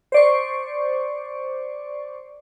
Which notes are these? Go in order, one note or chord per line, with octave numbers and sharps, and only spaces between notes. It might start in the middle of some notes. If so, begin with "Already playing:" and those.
C5 D5 C#6